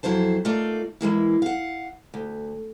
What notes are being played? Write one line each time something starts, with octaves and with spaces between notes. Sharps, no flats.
F2 F#3 E4 C5 A5
A3 A#3 D#4 F4 D5
E3 G#3 A#3 E4
F5 F#5
D2